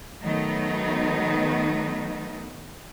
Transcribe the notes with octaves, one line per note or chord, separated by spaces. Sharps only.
D#3 F#3 A3 B3 D#4 B4